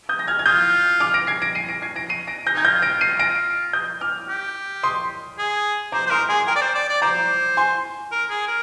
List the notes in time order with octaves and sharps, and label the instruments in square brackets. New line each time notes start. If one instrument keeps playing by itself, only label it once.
[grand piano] D#6 G6
A#6
F6 G#6
G#6
[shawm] F4 [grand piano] D#6 G6
[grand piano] D6 F6
A#6 D7
G#6 C7
A#6 D7
C7 D#7
A#6 D7
G#6 C7
A#6 D7
C7 D#7
A#6 D7
G6 A#6
[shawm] D#4 [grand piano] G#6
[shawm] F4 [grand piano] G6 A#6
[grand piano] A#6 D7
C7 D#7
A#6 D7
D#6 G6
D6 F6
[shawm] G4
[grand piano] C6 D#6
[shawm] G#4
[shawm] C5 [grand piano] A#5 D6
[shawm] C5
[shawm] A#4 [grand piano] C6 D#6
[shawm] G#4 [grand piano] G#5 C6
[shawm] A#4 [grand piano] G5 A#5
[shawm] D5
C5
D5
D5
[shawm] C5 [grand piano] A#5 D6
[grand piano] G#5 C6
[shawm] A#4
G#4
A#4